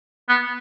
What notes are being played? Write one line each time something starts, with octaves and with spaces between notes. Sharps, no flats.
B3